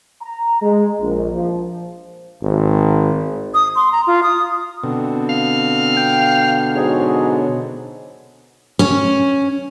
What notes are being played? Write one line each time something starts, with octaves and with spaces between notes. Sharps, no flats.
A#5
G#3
A#1
F3
G#1
D#6
C6
A#5
F4
D#6
B2 D3 C4
F5
G5
G#2 F#3 G#4
C#4